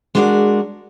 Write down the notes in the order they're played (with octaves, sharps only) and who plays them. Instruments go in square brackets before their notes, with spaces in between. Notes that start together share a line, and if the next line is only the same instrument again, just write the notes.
[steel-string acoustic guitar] G#3 D4 F#4 G4 A#4 D5